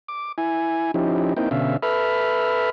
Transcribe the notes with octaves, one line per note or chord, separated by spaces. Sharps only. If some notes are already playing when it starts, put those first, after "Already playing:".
D6
E4 G#5
F3 C#4 D#4 E4 G4
A#3 C4 D#4 E4 G5
B2 D3 C#4 E5 F5
A4 B4 E5 B5 F6